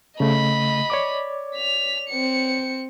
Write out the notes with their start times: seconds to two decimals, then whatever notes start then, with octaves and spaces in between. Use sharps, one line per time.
0.20 C#3 A3 D#5 B5
0.90 C#5 D5 D6
1.55 B6 F7
2.09 C4 C#7